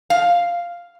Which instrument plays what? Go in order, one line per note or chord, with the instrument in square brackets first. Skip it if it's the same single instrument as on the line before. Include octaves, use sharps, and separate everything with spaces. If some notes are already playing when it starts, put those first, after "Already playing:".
[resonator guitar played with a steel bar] F5